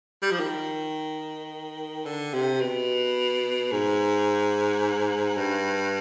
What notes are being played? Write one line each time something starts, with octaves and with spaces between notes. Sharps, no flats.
G3
F3
D#3
D3
C3
B2
G#2
G2